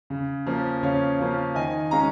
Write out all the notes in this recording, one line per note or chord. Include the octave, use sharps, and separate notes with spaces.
C#3
F3 A#3 C#4
C#3 C#5 F5
F3 A#3 C#4
D#3 D#5 G#5
G#3 C#4 F5 A#5